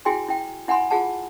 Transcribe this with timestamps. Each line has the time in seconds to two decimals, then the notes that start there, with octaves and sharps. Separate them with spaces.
0.05 E4 F#4 G#4 G5 G#5 C6
0.28 E4 G5
0.68 E4 F#5 G#5 B5 C6
0.90 F4 G#4 F#5 A5